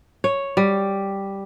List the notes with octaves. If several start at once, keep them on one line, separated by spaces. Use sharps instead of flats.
C#5
G3